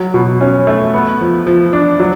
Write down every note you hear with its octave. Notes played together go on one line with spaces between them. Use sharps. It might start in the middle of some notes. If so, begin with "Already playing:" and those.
Already playing: F#3
B2
C#4
A3
B3
F3
F3
D4
F#3